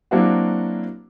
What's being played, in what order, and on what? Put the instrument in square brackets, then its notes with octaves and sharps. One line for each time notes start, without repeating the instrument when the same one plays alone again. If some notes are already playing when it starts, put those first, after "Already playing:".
[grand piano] F#3 A#3 C4 D4 E4 F#4